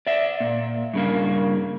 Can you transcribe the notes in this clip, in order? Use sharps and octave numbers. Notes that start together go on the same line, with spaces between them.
D5 E5
A#2
G2 C#3 A#3